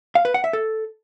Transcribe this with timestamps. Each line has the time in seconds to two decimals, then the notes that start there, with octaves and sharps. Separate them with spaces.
0.15 F5
0.25 B4
0.34 F#5
0.44 E5
0.53 A4